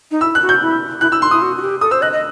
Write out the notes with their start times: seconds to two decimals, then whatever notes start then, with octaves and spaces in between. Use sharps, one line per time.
0.11 D#4
0.21 E4 E6
0.35 F#6
0.42 F#4
0.49 G6
0.62 E4
1.01 E4 F#6
1.12 E4 E6
1.21 D#4 C6
1.31 E4 D#6
1.42 F#4
1.56 F#4
1.62 G4
1.81 A4 D#6
1.91 C5 E6
2.02 D#5 F#6
2.12 D#5